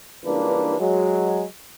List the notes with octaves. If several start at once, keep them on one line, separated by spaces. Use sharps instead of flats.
C#2 G2 E3 A#3 D4 B4
F#3 G#3